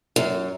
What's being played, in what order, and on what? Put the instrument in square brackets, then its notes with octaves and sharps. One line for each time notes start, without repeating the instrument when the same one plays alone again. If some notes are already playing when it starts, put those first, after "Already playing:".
[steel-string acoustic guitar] F#2